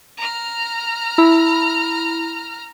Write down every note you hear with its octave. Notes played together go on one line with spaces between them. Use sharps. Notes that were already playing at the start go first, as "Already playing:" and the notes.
A#5 F6
E4 B5